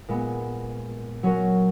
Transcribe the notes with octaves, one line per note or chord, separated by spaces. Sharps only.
A#2 G#3 B3
F#3 C#4 F#4 A#4